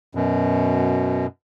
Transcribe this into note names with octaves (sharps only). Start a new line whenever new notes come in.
F#2 B2